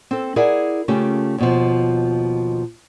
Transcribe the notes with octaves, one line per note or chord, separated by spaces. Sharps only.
C4 A4
E4 G#4 A#4 D5 E5 F#5
C#3 A3 C#4 F4 G4
D#2 B2 F3